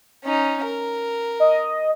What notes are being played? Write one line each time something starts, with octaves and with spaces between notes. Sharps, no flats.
C#4 D#4
A#4
D#5